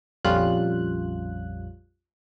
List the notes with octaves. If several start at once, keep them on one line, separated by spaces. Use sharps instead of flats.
A#1 F2 G3 C#4 F4 F#6